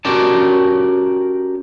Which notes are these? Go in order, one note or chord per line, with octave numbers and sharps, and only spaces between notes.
C#4 F#4 G4 A#4 D5 A5